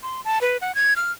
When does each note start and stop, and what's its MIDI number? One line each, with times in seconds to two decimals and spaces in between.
0.03 0.21 84
0.25 0.39 81
0.41 0.57 71
0.61 0.74 78
0.75 0.94 92
0.96 1.12 89